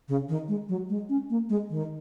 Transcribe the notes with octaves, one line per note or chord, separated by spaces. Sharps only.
C#3
D#3
G#3
F#3
G#3
C#4
A#3
G#3
D#3